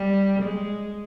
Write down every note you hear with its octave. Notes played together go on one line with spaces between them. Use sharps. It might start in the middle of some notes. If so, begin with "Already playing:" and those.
Already playing: G3
G#3